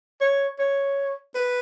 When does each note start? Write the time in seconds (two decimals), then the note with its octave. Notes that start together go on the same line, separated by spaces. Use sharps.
0.21 C#5
0.59 C#5
1.35 B4